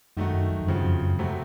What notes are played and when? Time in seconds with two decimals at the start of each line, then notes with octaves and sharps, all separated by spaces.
0.17 F#2 D#3 A3 D#4 F#4
0.34 F#2
0.50 F#2
0.61 F2
0.67 F#2 C#3 F3 C4 F#4
0.84 F2
1.02 F#2
1.19 C3 F#3 A3 C4 F#4